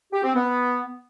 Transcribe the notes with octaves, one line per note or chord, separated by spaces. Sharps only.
G4
C4
B3